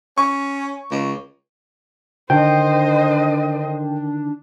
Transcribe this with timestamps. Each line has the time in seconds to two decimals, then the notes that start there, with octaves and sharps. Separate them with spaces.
0.18 C#4 C#6
0.91 C#2
2.30 D3 D#3 D4 C5 D#5 G5